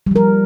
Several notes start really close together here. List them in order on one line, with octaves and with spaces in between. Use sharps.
G3 F3 A#4